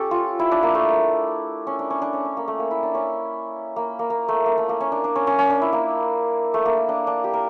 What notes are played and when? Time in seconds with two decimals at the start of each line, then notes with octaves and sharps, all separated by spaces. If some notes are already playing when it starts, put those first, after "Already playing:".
Already playing: C#4 G4 A4
0.11 F4
0.39 E4
0.52 D4
0.63 A#3
0.75 A3
1.67 C#4
1.79 D4
1.90 C#4
2.02 D4
2.13 C#4
2.25 C#4
2.37 A#3
2.48 A3
2.59 A#3
2.71 E4
2.83 D4
2.95 C#4
3.76 A#3
3.99 A#3
4.10 A#3
4.28 A3
4.46 A#3
4.58 A3
4.69 A#3
4.80 C#4
4.92 D4
5.04 D4
5.16 C#4
5.27 C#4
5.39 C#4
5.50 D4
5.62 E4
5.73 A#3
6.54 A3
6.65 A#3
6.89 D4
7.07 D4
7.24 G4
7.33 A#4